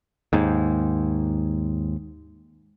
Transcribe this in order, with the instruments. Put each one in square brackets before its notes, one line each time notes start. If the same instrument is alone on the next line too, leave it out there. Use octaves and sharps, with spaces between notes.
[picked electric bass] D#2 G#2